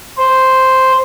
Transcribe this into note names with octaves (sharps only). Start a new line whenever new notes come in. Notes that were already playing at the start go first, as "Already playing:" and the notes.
C5